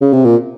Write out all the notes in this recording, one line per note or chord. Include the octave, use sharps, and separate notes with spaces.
C#3
C3
A#2